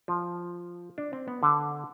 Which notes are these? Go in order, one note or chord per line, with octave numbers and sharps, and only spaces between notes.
F3
D4
C4
B3
D3